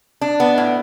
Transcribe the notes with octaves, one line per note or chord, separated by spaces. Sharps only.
D4
B3
A2